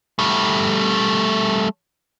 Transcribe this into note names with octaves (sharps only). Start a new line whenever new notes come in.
G3 A3